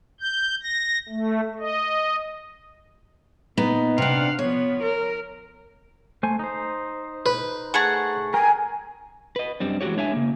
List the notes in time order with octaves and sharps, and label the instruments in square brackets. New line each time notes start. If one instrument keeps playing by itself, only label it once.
[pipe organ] G6
A#6
A3
D#5
[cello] A#2 [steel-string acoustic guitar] B3 D#4
[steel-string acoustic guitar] C3 D4 [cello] F5 F#5
[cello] F3 B3 [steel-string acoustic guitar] C#5
[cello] A#4
[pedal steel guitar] A3 C5 G#5
D#4 C5
[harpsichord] B4
[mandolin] A3 G#4 F#5
[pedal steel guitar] A#4 G5 A#5 [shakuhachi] G#5
[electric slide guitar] B4 D#5
F#2 G3 C4 D4
E3 G#3 C4 F#4 G4 C#5
G#3 D4 C#5 E5 F#5 G#5
C#3 A#3